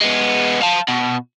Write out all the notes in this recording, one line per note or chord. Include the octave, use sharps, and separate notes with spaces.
G#3 B3
F5 A5
B2